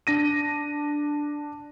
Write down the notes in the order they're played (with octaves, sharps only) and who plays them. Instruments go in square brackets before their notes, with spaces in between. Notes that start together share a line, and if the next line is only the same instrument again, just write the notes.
[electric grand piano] D4 A#6 D#7